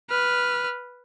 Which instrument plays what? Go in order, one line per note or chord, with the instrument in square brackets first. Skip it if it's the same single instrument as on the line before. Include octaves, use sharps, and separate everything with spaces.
[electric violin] B4 F6